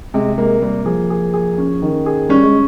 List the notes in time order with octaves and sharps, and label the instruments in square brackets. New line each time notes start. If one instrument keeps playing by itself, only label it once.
[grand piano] C3 [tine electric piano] G#3
[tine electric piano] G#3 [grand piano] A#3
[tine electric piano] G3 [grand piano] A#3
[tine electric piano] F3 [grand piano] G#4
[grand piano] G#4
G#4
C#4
D#3
G#4
[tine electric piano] G3 [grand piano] C#4
[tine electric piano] G#3